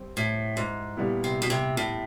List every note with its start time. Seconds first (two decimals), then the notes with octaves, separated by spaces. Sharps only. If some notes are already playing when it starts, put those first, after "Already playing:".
Already playing: G3 C4
0.17 A2
0.57 G#2
0.97 A#2 G3 B3 E4
1.24 C3
1.42 B2
1.50 C3
1.77 A2